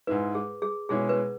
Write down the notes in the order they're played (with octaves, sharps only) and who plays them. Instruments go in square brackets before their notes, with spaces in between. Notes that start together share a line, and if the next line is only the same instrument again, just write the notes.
[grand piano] G#2 G#3 E4 [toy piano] B4
[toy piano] G#4
G#4
[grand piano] B2 G#3 C#4 E4 [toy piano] G#4
[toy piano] B4